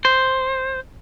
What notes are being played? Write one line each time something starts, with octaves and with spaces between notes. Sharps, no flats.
C5